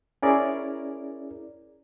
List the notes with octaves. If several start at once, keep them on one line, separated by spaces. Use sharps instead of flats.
C#4 E4 G#4 A#4 D5